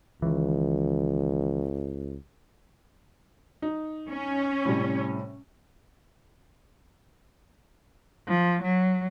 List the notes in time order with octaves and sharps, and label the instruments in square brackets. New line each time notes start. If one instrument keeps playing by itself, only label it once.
[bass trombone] C#2 [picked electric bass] D#3 E3
[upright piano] D#4
[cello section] C#4
[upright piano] A2 C3 G3
[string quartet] F3
F#3